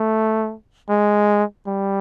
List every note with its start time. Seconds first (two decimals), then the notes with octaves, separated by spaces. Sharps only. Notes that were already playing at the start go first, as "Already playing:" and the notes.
Already playing: A3
0.89 G#3
1.67 G3